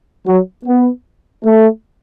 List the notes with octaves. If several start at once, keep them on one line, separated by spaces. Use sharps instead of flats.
F#3
B3
A3